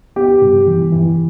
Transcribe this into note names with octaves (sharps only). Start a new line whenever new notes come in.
B3 G4
G2
E3
E3